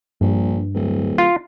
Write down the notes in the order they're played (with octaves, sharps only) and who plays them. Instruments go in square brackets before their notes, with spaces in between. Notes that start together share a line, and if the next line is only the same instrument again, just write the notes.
[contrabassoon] A#1 [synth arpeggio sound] G2
[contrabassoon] D1
[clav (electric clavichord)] F4